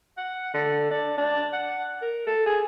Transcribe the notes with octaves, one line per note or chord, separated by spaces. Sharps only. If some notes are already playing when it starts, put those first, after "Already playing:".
F#5
D3
D4
D4
F#5
A#4
A4
G#4